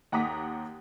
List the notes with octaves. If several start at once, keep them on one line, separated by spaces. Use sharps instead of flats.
D#2 F#5 A#5 D6 D#6 B6